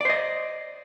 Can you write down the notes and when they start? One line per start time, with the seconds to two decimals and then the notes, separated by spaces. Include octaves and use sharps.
0.01 D5
0.05 C5
0.10 D#5